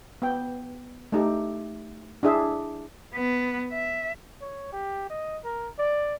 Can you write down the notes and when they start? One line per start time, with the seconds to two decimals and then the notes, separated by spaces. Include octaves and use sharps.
0.22 B3 G5
1.12 A3 D#4 G4
2.23 D4 E4 G#4 E5
3.14 B3
3.72 E5
4.41 C#5
4.73 G4
5.10 D#5
5.44 A#4
5.79 D5